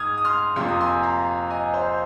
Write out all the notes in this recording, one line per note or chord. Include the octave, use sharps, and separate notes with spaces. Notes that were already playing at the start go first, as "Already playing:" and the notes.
Already playing: G#2 G#3 D#6 F6 G#6
D#6
C6 F6
F2 C3 F3 A#3 C6
D#6
G#5 C6
F5 A#5
D#5 G#5
C5 F5